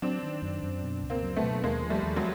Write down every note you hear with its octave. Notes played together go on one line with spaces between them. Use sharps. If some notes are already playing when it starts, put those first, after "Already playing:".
F#3 C4 D4
D#3
F#2
F#2
B2
C#2
A#3 C4
F#3
A3 B3
B2
D#2 G#3 A#3
F3
G3 A3
D#2
F#3 G#3